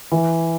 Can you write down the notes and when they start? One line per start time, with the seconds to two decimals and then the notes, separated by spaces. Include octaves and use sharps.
0.12 E3